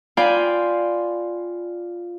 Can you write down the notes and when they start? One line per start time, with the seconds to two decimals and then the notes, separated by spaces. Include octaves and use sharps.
0.17 F4 D5 G5 G#5 B5 C6